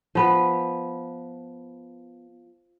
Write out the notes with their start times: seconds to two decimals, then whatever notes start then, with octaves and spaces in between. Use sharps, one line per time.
0.15 F3 B3 B4